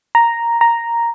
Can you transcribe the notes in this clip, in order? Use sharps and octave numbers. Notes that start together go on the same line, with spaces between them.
A#5
A#5